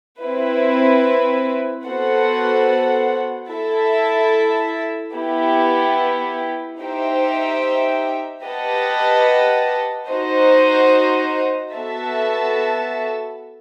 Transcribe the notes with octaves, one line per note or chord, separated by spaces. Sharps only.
C4 E4 B4
B3 F#4 A4 C5 F#5
E4 A4 E5 A5
B3 E4 G4
D#4 G4 C5 E5 G5
G4 B4 D#5 F#5 A5
D#4 F#4 C5 D#5
B3 F#4 A4 E5 A5